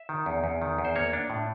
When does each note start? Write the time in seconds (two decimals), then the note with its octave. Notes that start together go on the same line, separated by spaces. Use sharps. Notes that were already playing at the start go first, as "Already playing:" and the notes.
Already playing: E5
0.09 D#3
0.26 E2
0.44 E2
0.62 D#3
0.78 E2
0.85 C5
0.96 A#3 C#5
1.13 D4
1.30 A2